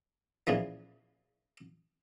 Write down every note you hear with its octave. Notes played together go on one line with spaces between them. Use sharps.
A#2 C#3 E3 F3